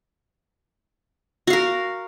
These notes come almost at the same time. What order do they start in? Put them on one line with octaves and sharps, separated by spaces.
F#4 F5 A#4